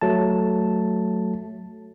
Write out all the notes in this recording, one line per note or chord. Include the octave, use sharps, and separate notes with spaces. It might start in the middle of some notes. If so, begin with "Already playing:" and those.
F#3 A3 A5